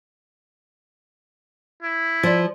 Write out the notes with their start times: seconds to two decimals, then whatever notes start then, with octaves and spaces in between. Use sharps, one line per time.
1.82 E4
2.23 F3 C5 D5